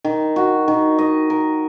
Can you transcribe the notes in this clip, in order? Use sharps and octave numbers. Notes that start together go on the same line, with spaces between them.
D#3
F#4
D#3
D#5
A#4